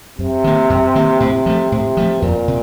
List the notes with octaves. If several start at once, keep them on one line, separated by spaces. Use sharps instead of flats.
F#2 C3
D#3 A#3
F#2
D#3 A#3
A2 C3
F3 A3
A2 C3
F3 A3
F2 A#2
C3